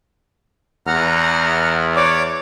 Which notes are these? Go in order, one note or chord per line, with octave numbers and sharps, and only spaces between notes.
E2 F#5 A#5 F6
C#5 D5 D6